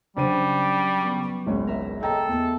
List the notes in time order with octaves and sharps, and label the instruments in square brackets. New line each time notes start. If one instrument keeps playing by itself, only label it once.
[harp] C#3 F#3 [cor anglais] G3 [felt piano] D4 C5 D#7
[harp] B3 C#6
[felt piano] G#1 C#2 C#5
[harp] A#4 E5
[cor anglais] A4 [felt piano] D#5 G5 A#5
[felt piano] E2